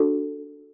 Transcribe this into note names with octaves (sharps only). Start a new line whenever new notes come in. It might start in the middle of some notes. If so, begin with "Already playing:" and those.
Already playing: D4 F#4 A4